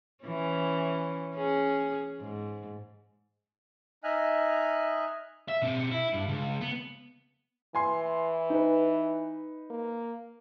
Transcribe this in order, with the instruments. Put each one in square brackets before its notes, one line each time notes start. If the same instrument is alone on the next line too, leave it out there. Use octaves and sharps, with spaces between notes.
[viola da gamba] E3 C#4
C#4 G#4
G#2
[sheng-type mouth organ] D#4 D#5 E5 G#5 F6 F#6
[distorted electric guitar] E5
B2 C4
E4
G2
C#2
B3
[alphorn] E3 [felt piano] G#5 C6
[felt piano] D#4 B4
[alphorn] A#3